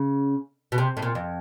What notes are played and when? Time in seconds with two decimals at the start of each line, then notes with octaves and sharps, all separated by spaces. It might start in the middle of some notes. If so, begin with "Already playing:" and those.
Already playing: C#3
0.72 B2
0.78 C3
0.97 A2
1.02 A#2
1.15 F2